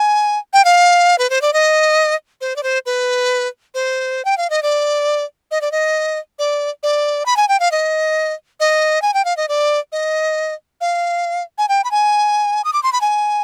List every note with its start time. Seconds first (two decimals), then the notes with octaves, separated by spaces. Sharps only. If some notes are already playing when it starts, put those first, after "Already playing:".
Already playing: G#5
0.53 G5
0.65 F5
1.18 B4
1.30 C5
1.41 D5
1.53 D#5
2.41 C5
2.56 D5
2.63 C5
2.86 B4
3.74 C5
4.25 G5
4.37 F5
4.50 D#5
4.63 D5
5.51 D#5
5.61 D5
5.72 D#5
6.39 D5
6.83 D5
7.26 B5
7.37 G#5
7.48 G5
7.60 F5
7.71 D#5
8.60 D#5
9.02 G#5
9.14 G5
9.25 F5
9.37 D#5
9.48 D5
9.92 D#5
10.81 F5
11.58 G#5
11.69 G5
11.84 B5
11.91 G#5
12.64 D#6
12.73 D6
12.83 C6
12.92 B5
13.01 G#5